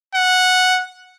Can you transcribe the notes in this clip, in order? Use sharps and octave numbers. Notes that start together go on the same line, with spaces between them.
F#5